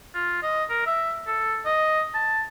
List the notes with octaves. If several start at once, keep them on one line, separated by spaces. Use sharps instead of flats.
F4
D#5
A#4
E5
A4
D#5
A5